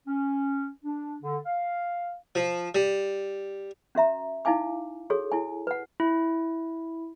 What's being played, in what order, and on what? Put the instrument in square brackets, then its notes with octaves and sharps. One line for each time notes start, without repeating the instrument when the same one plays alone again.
[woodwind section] C#4
D4
D3
F5
[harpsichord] F3
G3
[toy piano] C#4 F#4 E5 A#5
D#4 E4 F5 G#5 D6
F#4 G#4 A4 C#5
E4 G#5
B4 F#5
[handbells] E4